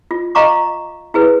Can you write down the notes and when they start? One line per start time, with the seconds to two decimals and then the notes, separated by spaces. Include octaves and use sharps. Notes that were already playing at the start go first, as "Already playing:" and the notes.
0.11 F4
0.35 D#5 F5 A#5 C#6 D6
1.14 E4 G#4 B4